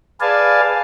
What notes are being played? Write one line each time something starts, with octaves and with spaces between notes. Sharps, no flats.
G#4 B4 D5 F5 G#5 A5